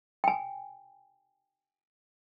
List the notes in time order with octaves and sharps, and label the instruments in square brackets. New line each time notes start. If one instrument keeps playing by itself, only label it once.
[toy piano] G5 G#5